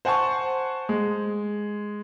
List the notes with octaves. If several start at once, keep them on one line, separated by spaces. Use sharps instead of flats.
C5 F#5 G#5 A5 C#6
G#3